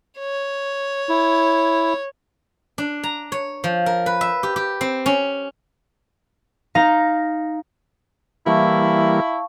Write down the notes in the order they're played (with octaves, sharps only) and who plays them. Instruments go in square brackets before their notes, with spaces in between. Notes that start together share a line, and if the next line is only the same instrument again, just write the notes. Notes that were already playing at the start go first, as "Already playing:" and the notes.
[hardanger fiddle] C#5
[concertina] E4
[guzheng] D4
A#5
C#5
F3
A#4
B4
E5
G4
G4
C4
C#4
[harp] D#4 F5 A#5 A#6
[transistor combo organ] E3 G3 A#3 [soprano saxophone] E4 [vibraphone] F5 A5 C#6